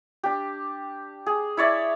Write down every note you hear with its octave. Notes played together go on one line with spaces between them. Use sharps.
D4 G4
G#4
E4 C#5 D5 E5